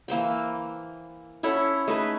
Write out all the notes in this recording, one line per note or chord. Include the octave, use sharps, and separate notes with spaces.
E3 A#3 C5 G5
C#4 E4 A4 F#5
A3 D#4 G#4 B4